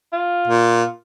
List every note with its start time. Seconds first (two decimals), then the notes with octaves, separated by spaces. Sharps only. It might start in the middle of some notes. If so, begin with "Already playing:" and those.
0.13 F4
0.48 A#2